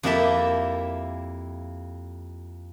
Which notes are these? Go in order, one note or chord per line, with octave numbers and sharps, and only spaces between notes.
F2 A#3 E4 G4 E5 A5